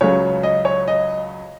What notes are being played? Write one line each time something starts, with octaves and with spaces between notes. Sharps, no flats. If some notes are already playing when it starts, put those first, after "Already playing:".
C#2 C#3 F#3 C#5
D#5
C#5
D#5